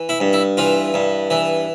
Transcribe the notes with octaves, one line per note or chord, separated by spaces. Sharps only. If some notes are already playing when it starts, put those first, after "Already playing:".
Already playing: E3
E4
G2
E4
E3 F4
G2
E3